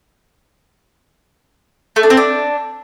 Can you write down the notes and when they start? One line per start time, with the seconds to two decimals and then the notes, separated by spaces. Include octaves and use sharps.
1.96 A3
2.03 D4
2.10 C4
2.17 D4